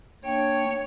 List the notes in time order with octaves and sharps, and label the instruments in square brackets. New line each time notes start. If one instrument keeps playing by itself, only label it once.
[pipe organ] A#3 D4 G5 [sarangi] C#5